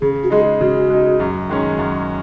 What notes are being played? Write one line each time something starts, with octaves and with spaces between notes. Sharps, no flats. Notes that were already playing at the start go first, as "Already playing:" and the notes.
C#3 G#4
F#4
G#3 D#4 G#4
C#3 F#4
G#3 D#4
F#2
D#3 G#3 C#4
F#2